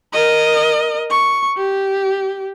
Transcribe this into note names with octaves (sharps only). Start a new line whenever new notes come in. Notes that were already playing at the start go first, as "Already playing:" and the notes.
A#4 D#5
C#6
G4